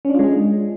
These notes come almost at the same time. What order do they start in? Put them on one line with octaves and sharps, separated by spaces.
C#4 D4 F4 G#3 G#4